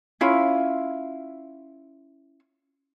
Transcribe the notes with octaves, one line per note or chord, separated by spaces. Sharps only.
C#4 E4 F4